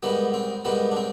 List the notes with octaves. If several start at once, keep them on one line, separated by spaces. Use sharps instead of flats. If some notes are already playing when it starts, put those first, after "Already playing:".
G#2 D#3 G3 B3
C4
G#2 D#3 G3 B3
D4
C4